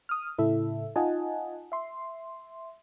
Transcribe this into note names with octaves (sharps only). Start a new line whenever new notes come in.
D#6 F6
A2 C#3 E4 A4 E5
D#4 F4 D#5 F#5 G#5 A5
E5 C6